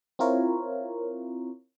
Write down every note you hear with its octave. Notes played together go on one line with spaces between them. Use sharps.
C4 E4 F4 A#4 C#5